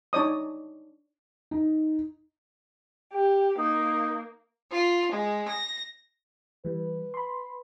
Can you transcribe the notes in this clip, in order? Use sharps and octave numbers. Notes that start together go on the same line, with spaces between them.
D4 D#4 C#5 D5 D#6
D#4
G4
A#3 D#4
F4
G#3
A#6
E3 G3 B4
B5 C6